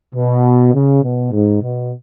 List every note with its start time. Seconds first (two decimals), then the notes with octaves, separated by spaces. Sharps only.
0.15 B2
0.73 C#3
1.02 B2
1.31 G#2
1.61 B2